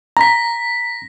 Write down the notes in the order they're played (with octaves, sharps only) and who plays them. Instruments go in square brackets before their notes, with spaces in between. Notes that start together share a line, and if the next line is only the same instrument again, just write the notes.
[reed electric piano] A#5 [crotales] A#6 B6